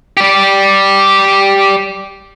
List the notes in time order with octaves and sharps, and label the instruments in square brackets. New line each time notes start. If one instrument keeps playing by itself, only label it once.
[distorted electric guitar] G4 D5